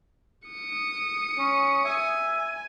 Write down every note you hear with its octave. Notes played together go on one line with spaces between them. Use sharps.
D#6 C#7
C#4
E5 G#5